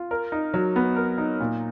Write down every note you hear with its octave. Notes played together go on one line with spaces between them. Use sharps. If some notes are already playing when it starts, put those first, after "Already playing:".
Already playing: F4
A#4
D#4
F#3
B3
A#4
D#4
A#2